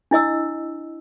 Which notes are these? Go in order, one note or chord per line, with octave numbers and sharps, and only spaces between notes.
D4 E4 D#5 E6